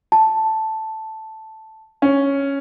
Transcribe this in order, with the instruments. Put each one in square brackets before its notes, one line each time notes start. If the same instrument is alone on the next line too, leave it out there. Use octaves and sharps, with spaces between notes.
[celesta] A5
[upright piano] C#4